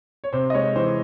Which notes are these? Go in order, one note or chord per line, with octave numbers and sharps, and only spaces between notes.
C#5
C3 C5
D#5
G#3 C#5
E3 C5